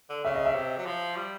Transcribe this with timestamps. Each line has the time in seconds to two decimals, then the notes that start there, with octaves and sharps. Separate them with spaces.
0.09 D3
0.24 C#3 E5
0.35 D#5
0.45 E5
0.55 C3
0.77 F#3
0.86 F3
1.16 G3